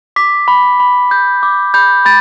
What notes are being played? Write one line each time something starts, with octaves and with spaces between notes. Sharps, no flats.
D6 B6
B5
B5
G6
D6
B5 G6
B5 A6